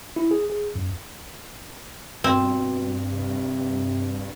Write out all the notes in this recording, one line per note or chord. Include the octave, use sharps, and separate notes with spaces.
E4
G#4
G#4
F#2
G2 B2 C4
C3